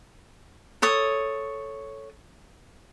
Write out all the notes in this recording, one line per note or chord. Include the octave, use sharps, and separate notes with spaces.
A4 C#5 D#6